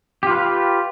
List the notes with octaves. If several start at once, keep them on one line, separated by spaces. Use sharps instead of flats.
F4 G4 B4 F5